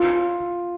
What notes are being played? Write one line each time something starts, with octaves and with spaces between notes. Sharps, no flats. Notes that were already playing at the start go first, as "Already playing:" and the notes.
Already playing: F4